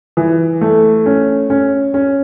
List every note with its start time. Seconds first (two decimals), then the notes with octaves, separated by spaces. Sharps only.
0.17 E3
0.61 A3
1.06 C#4
1.50 C#4
1.94 C#4